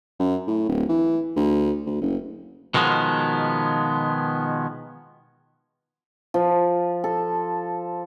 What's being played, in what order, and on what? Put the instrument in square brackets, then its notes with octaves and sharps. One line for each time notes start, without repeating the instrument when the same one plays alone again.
[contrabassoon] F#2
A2
D1
E3
D2
D2
F#1
[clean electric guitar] B2 D#3 F3 G#3 B3
[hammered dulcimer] F3
A4